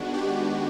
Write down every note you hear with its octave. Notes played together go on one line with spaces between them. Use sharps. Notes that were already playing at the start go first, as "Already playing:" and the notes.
Already playing: D#3 G#3 B3 D4 F#4
G4